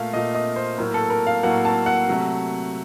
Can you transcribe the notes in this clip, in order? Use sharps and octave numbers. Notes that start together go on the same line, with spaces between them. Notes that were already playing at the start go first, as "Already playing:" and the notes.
Already playing: A#2 A3 F5
A#2 A3 D#5
D#5
C5
A2 F#3 A#3 A#4
A4
A#4
F5
A2 F#3 A#3 F#5
A5
F#5
C3 F#3 A3